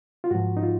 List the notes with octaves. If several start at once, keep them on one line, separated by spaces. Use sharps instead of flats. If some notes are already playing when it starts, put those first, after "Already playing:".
F4
G#2 F3 F#4
D#4
F4